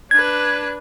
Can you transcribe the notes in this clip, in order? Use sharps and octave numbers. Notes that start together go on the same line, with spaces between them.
D4 B4 G#6